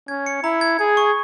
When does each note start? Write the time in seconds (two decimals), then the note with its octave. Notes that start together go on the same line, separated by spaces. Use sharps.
0.08 C#4 G#6
0.26 C#7
0.43 E4 A#5
0.61 G#6
0.79 G#4 G#6
0.97 C#6